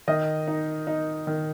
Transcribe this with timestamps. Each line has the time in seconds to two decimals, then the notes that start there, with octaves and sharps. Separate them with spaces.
0.08 D#3 D#5
0.48 D#4
0.87 D#4
1.27 D#3